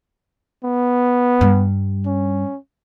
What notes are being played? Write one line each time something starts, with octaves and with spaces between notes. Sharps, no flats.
B3
G2 G3
C#4